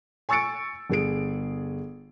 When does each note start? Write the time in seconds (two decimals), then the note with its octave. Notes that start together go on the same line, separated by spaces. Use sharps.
0.29 G#5 C#6 E6 A6 C#7 D7
0.90 G1 G#4 D7